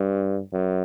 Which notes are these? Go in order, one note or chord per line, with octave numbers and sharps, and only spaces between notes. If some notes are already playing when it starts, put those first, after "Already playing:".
Already playing: G2
F#2